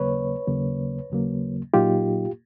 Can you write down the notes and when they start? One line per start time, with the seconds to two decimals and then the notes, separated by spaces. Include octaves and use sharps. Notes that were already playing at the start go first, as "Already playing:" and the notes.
Already playing: D#2 C#3 F#3 A#3 B4 C#5
0.47 D#2 C#3 F#3 A#3
1.10 D#2 C#3 F#3 A#3
1.74 A#2 F#3 A#3 D#4 F4 G4